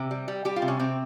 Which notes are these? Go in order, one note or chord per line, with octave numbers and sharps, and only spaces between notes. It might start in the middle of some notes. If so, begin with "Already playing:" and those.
Already playing: C3 G4
G3
G3
G3 G4
F4
C3
C#4
C3 C4